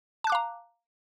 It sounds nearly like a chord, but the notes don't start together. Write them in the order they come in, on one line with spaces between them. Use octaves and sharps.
A5 F#6 D6 F5 A#5